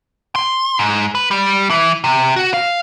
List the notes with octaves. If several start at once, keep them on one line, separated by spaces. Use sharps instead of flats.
C6
G#2
B4
G3
E3
C3
F#4
F5